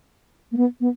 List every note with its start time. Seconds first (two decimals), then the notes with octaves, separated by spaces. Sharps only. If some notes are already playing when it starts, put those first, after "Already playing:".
0.52 A#3
0.57 B3
0.80 B3